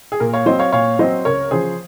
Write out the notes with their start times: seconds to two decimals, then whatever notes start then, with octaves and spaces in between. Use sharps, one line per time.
0.12 G#4
0.20 A#2 A#4
0.33 C#5 F5
0.46 F#3 C4 C5 D#5
0.59 C#5 F5
0.72 A#2 C#5 F5
0.99 F#3 C4 C5 D#5
1.25 C#2 A#4 C#5
1.51 C#3 F3 G#4 C5